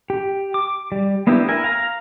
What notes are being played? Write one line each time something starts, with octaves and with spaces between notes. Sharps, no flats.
G4
D6
G3
A#3 B3 D4 E4 G4
E4 A#4 G#5
F5 A#5